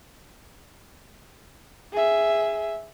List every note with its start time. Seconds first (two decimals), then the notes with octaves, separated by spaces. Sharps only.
1.93 G#4 E5